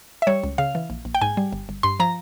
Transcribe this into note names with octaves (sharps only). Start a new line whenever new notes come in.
E5
G3 C#5
C#2
C#3 F5
E3
A#1
A#1
G5
G#2 G#5
G3
G1
G1
G2 C6
F3 A#5